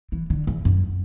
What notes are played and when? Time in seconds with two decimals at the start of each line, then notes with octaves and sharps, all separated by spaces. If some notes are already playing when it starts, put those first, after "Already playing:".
0.12 E3
0.30 D3
0.47 E2
0.65 F#2